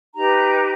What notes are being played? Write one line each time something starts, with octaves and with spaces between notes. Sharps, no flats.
D#4 G4 B4 A#5